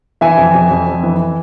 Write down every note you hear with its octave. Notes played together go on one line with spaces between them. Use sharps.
E3 E5 G#5
F2
F2
F2
F2
E3